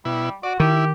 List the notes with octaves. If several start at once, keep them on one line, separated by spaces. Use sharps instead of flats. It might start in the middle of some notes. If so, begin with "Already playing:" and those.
B2 G3 E4
F#4 D5
D#3 E4 G4